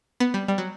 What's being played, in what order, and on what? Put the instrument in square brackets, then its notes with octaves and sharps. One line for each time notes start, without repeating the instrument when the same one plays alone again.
[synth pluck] B3
G3
G3
F#3